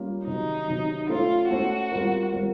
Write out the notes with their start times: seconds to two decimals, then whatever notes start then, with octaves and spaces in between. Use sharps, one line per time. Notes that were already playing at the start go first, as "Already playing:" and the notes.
Already playing: G3 A#3 C#4 F4 A#4
0.27 C3 D#3 F#3 D#4
0.68 C3 D#3 F#3
1.09 A3 C#4 E4 F4 A4 C5
1.50 A3 C#4 E4 F#4 A4 C5
1.92 G3 C4 F4 A#4
2.32 G3 C4 F4 A#4